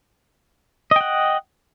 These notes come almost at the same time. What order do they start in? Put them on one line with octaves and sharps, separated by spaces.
D#5 G5 F#5